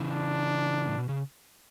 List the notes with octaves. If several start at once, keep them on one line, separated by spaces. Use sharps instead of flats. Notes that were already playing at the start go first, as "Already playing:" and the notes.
Already playing: C#3 E3
D4
A2
B2
C#3